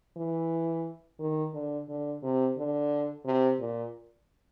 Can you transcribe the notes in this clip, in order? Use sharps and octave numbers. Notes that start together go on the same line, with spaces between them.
E3
D#3
D3
D3
C3
D3
C3
A#2